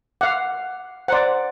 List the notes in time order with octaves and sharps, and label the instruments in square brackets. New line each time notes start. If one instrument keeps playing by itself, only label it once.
[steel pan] F5 F#5 [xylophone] D6
[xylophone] C5 A#5 C6 [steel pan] D5 F#5